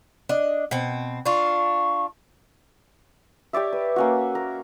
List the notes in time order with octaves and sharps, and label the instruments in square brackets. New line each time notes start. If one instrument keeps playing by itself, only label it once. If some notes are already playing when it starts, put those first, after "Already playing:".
[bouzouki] D4 D#5
B2 C4
[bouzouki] D4 F4 [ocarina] C#6
[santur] G4 C#5 D5 E5
B4
A#3 C#4 F#4
A#4